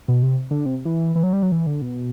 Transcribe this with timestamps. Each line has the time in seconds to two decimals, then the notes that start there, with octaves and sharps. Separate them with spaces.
0.08 B2
0.23 C3
0.51 D3
0.66 C3
0.85 E3
1.16 E3
1.23 F#3
1.33 G3
1.43 F#3
1.52 E3
1.67 D3
1.82 B2